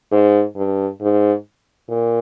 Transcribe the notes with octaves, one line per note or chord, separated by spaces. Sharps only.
G#2
G2
G#2
A#2